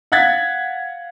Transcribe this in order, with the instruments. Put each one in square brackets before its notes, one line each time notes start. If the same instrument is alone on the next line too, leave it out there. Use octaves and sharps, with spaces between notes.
[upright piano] F5 F#5 F#6 G#6 A6 B6